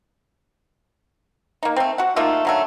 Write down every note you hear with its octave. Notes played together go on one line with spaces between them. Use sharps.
A#3 D#4
A3 C4
F#4 F#5
A3 A#3 D#4 F4
D3 F#3 A3